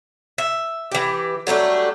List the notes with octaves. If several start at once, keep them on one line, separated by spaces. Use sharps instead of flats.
E5
E3 G4
F#3 G3 A3 D4